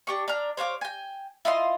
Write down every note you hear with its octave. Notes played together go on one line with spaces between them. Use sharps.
D4 G4 C#6
D4 A#5 F6
C5 C#5 F5 D6
G5 G#5
E4 F4 D#5 C6